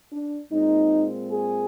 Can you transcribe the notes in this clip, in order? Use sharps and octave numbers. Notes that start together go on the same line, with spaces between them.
D4
A#2 G#3 C4 D#4
G#4